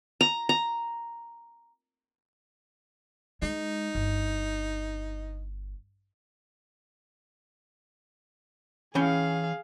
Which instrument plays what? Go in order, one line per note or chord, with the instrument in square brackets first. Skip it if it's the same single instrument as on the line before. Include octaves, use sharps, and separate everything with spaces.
[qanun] A#5
A#5
[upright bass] G#3 [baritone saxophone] D#4
[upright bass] G1
[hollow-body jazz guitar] E3 C#4 G5 [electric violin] G#4 F5